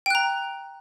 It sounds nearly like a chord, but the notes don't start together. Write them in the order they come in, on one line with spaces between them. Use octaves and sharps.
G5 F#6 A#5